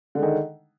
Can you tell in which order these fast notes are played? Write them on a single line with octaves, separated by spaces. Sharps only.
D3 G#3 D#3